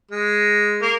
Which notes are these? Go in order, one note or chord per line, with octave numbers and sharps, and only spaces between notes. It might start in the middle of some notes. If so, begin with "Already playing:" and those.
G#3
A#3